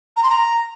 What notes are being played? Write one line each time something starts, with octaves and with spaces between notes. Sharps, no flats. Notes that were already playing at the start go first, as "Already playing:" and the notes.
A#5
C6
A#5